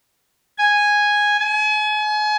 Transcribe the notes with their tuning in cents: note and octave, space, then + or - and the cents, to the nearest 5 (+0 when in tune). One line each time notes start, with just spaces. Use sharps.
G#5 -5
G#5 +35